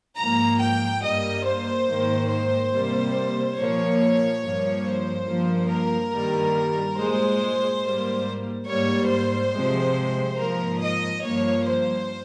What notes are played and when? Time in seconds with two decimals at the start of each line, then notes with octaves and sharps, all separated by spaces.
0.17 G#2 F3 A#3 A#5
0.60 G5
1.02 G2 G3 A#3 D#5
1.45 C5
1.87 G#2 D#3 A#3
2.30 C5
2.73 C3 G3 A#3
3.57 A#2 F3 A#3 C#5
4.42 G2 F3 A#3
4.85 C5
5.27 G2 F3 A#3
5.70 A#4
6.12 G2 D#3 G3 A#3
6.97 A#2 G#3 C5
7.83 G#2 G3 A#3
8.67 G#2 G3 A#3 C#5
9.10 C5
9.53 C3 F3 G#3
10.38 G#2 F3 A#3 A#4
10.80 D#5
11.23 G2 F3 A#3 C#5
11.65 C5